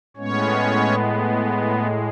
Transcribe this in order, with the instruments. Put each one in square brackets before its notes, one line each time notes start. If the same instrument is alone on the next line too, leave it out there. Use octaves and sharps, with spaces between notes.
[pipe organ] A2 G#3 B3 C#4 C#5